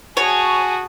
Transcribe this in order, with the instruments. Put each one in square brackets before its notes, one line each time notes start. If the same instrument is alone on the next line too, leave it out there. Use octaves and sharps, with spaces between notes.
[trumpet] F#4 [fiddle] G#4 A5 [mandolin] C#5 [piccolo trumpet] G#5